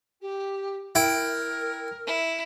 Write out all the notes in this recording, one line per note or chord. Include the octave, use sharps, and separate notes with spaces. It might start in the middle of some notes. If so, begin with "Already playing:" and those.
G4
E4 A#4 G5
E4